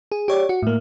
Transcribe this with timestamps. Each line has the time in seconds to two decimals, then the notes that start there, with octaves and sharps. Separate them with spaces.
0.12 G#4
0.28 G4 C#5 D5
0.49 F#4
0.62 A2 A#3